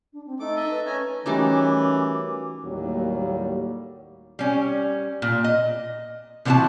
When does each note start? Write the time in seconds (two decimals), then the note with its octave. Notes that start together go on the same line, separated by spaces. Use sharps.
0.13 D4
0.26 C4
0.40 A3 D#4 D6
0.56 A4 D#5 E5
0.70 B4
0.86 C#4 G#5 A#5
1.26 E3 G3 A3 C#4 D#4 F#4 A#4 D6
2.65 D#2 A2 F#3 G3 A#3
4.39 G3 C#4
5.22 A#2
5.44 D#5
6.45 C3 E3 B3 D4 F#4 A5